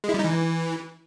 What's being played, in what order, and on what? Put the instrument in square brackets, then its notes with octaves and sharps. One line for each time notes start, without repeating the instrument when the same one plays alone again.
[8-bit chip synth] G#3
E4
G3
D#4
E3